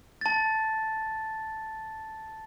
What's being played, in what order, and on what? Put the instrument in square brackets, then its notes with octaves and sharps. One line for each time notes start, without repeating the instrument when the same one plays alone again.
[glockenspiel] A5 A6